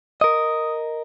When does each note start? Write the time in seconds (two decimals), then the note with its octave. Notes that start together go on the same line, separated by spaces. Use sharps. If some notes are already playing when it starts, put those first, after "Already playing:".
0.21 A#4 D#5 D#6